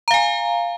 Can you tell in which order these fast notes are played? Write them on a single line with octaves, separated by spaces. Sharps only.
A#5 F5 G#5